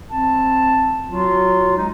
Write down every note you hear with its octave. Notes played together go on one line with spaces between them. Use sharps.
C4 A5
F#3 F4 F#4
G#3 D#4